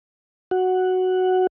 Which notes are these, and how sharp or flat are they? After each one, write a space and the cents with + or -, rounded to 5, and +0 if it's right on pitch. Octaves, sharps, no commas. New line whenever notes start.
F#4 +0 F#5 +0